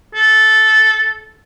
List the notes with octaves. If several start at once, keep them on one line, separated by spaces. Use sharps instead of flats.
A4